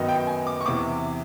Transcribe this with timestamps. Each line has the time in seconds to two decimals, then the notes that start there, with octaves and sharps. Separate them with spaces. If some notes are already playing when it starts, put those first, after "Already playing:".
Already playing: F#2 D#3 F#3 B3 D#4
0.09 G5
0.27 G#5
0.47 D6
0.61 C#6
0.66 E2 C3 E3 D6